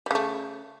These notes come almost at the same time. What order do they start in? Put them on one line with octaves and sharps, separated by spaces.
G3 C#3 A3